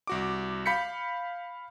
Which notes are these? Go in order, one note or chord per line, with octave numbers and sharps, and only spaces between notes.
C2 F#4 D6
F5 B5 G6 B6 C#7